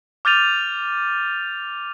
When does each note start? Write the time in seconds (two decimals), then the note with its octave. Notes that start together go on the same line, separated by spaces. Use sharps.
0.25 D6 F6 G6 A6 D#7 F7